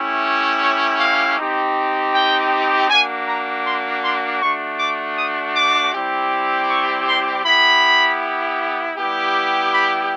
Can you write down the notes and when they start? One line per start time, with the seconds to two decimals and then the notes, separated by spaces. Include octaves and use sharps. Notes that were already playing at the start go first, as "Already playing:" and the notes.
Already playing: A3 C#4 E4 G4
0.62 C#5
1.00 F5
1.38 C4 D#4 G4
2.14 G5
2.89 A#3 D4 F#4 G#5
3.28 A#5
3.65 C6
4.03 C6
4.41 A3 D4 F#4 C#6
4.79 D6
5.17 D#6
5.55 D6
5.93 G3 C4 E4 G4
6.69 C#6
7.07 C6
7.45 B3 E4 G4 B5
8.97 G3 B3 E4 G4
9.73 B5